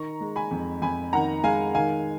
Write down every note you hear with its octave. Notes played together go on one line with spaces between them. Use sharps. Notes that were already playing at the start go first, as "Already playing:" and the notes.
Already playing: D#3 A#5 C#6
G#3
G#5 B5
F2
F2 G#5 B5
D#3 F#5 A#5
G#3 F5 G#5
D#3 F5 G#5